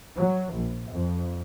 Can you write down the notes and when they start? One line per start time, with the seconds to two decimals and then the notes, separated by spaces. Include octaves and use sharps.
0.19 F#3
0.54 A#1
0.91 F2